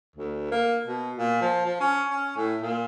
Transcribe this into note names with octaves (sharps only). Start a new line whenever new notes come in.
D2
A#3
B2
A#2
F3
F3
C#4
C#4
A2
A#2